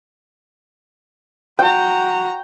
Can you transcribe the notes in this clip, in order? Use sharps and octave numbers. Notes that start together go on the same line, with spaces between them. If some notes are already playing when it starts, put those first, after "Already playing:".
F#4 G5 A#5